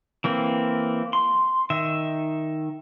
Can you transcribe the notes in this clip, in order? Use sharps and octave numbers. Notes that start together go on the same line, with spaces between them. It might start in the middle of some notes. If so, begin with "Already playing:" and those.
E3 A#3 C4
C6
D#3 E5